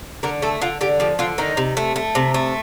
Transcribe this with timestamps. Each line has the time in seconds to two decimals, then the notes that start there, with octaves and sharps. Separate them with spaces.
0.23 D3 A#4
0.42 A3 A4
0.61 D3 F4
0.81 D3 G4
1.00 F3 G4
1.19 D3 F4
1.38 D#3 D#4
1.57 C3
1.77 A3
1.96 A3
2.15 C3
2.34 A3